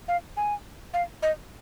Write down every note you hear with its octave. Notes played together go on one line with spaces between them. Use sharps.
F5
G#5
F5
D#5